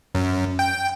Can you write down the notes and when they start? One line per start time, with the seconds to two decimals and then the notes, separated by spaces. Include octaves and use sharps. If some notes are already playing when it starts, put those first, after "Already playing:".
0.15 F#2
0.59 G5